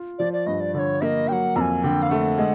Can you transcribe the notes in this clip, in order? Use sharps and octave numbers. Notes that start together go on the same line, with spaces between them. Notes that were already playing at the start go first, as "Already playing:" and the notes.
Already playing: F4
F3 D5
D5
G2 D#5
D5
D3 C#5 D5
A#3 D#5 E5
F#3 F#5 G5
F2 G#5 A#5
D3 G5
F5
A3 F#5
G#3